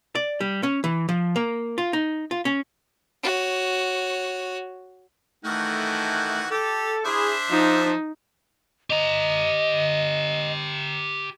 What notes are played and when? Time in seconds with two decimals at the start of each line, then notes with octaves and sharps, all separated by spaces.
0.15 D5
0.41 G3
0.63 C#4
0.84 E3
1.09 F3
1.36 A#3
1.78 F4
1.93 D#4
2.31 F4
2.45 C#4
3.23 F#4 C#5
5.45 D#3 E3 A3 F#4
6.51 G4 A4
7.05 D4 E4 G#4 C5 E5
7.50 F3 D#4
8.90 G4 D#5 A#5